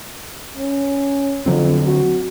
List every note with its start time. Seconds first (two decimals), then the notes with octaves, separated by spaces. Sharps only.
0.57 C#4
1.46 F2 D3 F#3 C4
1.86 F#4